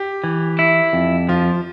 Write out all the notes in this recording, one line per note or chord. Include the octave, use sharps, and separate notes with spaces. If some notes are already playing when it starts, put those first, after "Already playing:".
Already playing: G4
E3
E4
F2
F3 F4